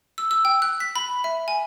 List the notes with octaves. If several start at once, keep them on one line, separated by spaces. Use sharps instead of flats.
E6
E6
G5
F#6
B6
B5
E5
G#5